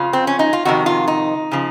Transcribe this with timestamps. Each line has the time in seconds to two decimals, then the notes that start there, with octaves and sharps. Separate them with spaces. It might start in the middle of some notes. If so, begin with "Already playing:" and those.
Already playing: F2 C#3 F3 F4
0.13 C4
0.27 C#4
0.39 D#4
0.53 F4
0.65 F2 C3 D#3 F#4
0.86 F4
1.08 D#4
1.51 C#3 F3